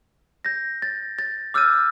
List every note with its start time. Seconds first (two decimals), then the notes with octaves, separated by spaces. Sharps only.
0.45 G6 A#6
0.82 A6
1.19 A6
1.54 D6 E6 F6 G6 A6 D#7